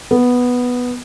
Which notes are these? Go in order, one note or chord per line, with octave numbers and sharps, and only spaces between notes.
B3